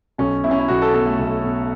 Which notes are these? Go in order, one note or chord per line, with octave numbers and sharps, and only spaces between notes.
B1 C#4
B2 E4
C#4
E4
B1 F#4
A4
B2 A4
A3
B1
B2